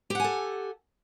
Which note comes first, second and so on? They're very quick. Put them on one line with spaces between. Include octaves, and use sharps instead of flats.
G4 F#5 G#5 A4